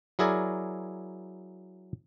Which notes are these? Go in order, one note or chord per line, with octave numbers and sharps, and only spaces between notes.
F#3 E4 G#4 A#4 D5